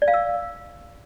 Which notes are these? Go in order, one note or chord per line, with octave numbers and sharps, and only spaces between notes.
D5
F5
E6